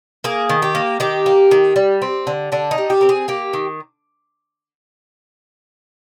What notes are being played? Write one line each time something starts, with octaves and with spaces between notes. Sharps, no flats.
A#3 G#4
D#3
G4
A#3
D#3 G4
A#3
D#3
G3
C4
D3
D3 D4
D#4
G3
G4
C4 A#4
G#4
A#3 G4
D#3